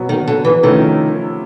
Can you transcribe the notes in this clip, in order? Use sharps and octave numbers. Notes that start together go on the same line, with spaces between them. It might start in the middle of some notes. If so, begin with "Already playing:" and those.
Already playing: B2 F#3 B3
D#3
D3
E3
C3 D#3 F3 A3 C#4 E4